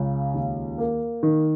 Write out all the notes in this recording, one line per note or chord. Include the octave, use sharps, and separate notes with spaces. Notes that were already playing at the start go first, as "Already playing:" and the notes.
Already playing: C#2 C#3
D#2
A#3
D#3